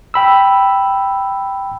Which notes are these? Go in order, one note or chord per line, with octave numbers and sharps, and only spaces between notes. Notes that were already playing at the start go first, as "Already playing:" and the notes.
G5 B5 E6